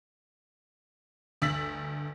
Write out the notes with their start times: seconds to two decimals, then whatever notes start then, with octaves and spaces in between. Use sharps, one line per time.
1.42 G1 D2 E6 A6 B6 F#7